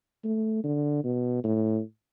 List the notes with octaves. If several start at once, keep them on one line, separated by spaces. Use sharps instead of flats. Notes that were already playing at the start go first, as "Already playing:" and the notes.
A3
D3
B2
A2